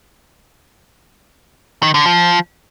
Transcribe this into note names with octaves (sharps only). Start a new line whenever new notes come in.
D#3
D3
F3